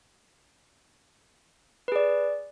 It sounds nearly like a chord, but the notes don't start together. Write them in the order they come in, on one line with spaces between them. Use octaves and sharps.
B4 G#4 D5